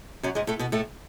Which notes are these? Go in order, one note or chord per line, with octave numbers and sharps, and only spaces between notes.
F#2 F#3
G#2 G#3
A2 A3
B2 B3
A2 A3